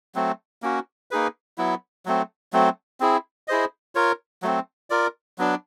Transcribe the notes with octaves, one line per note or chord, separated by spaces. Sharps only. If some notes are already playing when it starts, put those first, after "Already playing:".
F#3 A3 C4
A#3 C#4 F#4
A#3 D#4 G#4 B4
F#3 B3 E4
F#3 A3 C4
F#3 A3 C4
C4 E4 G#4
E4 G#4 C5 D#5
F4 A#4 C#5
F#3 A3 C4
F4 A#4 D5
F#3 B3 D4